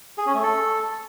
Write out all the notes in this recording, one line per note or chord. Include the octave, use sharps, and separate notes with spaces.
G#4
C#4
A3
A4